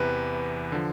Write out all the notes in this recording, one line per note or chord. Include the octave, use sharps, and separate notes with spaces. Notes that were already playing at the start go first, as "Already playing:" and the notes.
Already playing: E2 C3 E3 B4
D3 F3